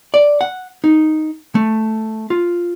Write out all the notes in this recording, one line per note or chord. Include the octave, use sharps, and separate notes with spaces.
D5
F#5
D#4
A3
F4